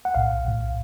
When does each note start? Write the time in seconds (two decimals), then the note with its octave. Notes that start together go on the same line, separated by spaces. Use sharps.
0.05 F#5
0.15 B1 A2 F5
0.44 B1 A2